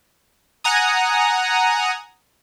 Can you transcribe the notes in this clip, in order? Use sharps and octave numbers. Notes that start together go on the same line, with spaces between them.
F#5 G#5 A#5 D#6